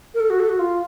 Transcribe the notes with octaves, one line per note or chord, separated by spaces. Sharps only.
A#4
A4
F#4
A4
F#4
F4